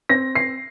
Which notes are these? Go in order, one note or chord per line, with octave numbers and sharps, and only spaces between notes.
C4 A#6
C7